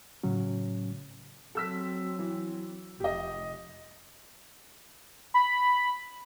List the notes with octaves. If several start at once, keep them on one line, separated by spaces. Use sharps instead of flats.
A2 C#3 F#3 C#4
F#3 C4 A4 E6 B6
E3
F1 G4 D#5
B5